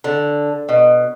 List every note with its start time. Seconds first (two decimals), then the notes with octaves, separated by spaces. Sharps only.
0.04 D3
0.69 B2